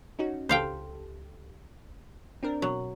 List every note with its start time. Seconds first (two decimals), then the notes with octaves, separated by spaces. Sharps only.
0.19 C#4 D#4 F#4
0.49 C#2 G4 A4 C5 F5 G5
2.43 C4 D4 A#4
2.62 B2 F#3